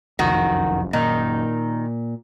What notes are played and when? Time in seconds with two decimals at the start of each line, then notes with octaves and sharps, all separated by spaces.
0.19 F#1 C2 F2 D#3 F#4
0.93 A#2 D#3 D#4